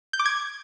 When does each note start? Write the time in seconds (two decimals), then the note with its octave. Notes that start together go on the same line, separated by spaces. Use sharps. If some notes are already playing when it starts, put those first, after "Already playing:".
0.13 G6
0.19 D6
0.26 G#6